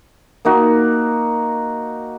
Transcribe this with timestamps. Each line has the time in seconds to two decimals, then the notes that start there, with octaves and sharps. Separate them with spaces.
0.45 A#3 D#4 F#4